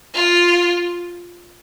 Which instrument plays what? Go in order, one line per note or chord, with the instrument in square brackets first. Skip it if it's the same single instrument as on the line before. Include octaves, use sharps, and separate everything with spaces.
[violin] F4